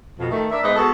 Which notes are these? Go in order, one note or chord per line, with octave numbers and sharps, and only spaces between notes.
F2 B2
D#3 A3
D4 A#4 E5
G#2 B3 B4 D#5
G#3 B3 F#4 G#4 A4